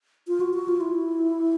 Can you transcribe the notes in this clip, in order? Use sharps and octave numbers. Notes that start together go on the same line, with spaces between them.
F4
F#4
F#4
F4
E4